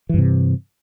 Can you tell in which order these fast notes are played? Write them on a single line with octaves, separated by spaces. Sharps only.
E3 G2 C3